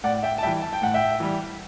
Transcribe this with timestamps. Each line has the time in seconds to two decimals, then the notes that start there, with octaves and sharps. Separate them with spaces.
0.04 A2 D5 F#5
0.23 E5 G5
0.38 A5
0.43 E3 G3 E5 G5
0.62 A5
0.73 G5
0.82 A2 F#5
0.94 E5 G5
1.20 E3 G3